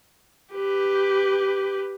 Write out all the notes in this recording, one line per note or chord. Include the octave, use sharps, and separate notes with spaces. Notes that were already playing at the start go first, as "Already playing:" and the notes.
G4 B4